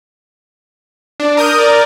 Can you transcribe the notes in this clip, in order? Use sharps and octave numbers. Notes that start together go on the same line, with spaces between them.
D4
A#4 D#6 G6
A#4 D5